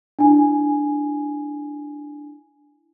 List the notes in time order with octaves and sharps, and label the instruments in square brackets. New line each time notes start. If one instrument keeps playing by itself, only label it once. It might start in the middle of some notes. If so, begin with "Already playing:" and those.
[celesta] D4 E4 G#5